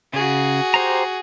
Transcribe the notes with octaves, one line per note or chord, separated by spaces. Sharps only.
C#3 F#4 G#4
G4 C5 A#5